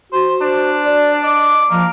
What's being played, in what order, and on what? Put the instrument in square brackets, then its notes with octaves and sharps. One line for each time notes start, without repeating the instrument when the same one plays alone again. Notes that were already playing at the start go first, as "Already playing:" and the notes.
[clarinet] F#4 [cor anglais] C5
[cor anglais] D4 [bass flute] C5
[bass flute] D5
[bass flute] D#5 [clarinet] D6
[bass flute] F3 [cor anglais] A#3